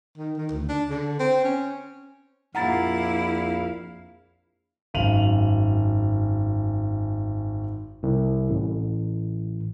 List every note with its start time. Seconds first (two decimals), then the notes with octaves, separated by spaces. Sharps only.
0.17 D#3
0.37 D#3
0.52 D2
0.69 D4
0.89 D3
1.20 C4
1.44 C#4
2.55 A#1 F2 A#2 E4 F5 F#5 A#5 A6
4.94 G#1 F#2 F5 D#7 F7 F#7
8.03 C2
8.50 A1